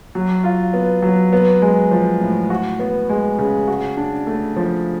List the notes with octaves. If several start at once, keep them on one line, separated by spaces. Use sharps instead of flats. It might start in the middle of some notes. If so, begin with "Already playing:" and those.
F#3
F4
B3
F#3
B3
G#3
F3
A2
F#4
B3
G#3
C#3
F#4
D4
A3
F3